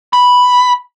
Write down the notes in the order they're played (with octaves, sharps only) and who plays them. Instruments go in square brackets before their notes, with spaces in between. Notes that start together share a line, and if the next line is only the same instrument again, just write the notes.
[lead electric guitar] B5